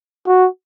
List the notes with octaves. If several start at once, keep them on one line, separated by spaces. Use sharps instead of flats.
F#4